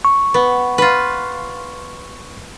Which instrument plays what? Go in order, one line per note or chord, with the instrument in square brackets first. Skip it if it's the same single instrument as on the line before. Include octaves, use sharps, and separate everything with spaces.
[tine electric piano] C#6
[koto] B3
F4 B4